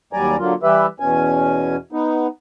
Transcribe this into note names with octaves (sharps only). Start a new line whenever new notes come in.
D#2 F#3 G3 D5 G#5 A#5
D3 F#3 A#3 F4
E3 G3 G4 B4 E5
E2 B2 C#4 G#5
B3 D#4